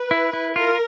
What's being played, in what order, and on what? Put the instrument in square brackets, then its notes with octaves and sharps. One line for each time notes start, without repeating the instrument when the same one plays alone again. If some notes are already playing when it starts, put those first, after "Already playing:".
Already playing: [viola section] B4
[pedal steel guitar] E4
E4
[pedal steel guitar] F4 [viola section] A#4